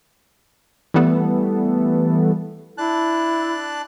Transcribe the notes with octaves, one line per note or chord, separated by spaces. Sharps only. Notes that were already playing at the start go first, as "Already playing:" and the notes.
E3 G3 A3 B3 A4
D4 E4 A5 F#6